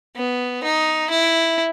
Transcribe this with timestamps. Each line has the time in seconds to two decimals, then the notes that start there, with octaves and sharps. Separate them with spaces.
0.16 B3
0.63 D#4
1.10 E4